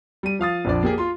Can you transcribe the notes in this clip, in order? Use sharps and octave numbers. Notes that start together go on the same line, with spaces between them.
G3 D#7
F3 F5 D#6 A6
A#1 F2 D4 D5
A#3 G4 G#4
F4 C6